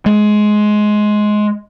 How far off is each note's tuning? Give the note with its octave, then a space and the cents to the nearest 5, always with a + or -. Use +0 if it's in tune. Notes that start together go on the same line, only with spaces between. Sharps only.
G#3 +15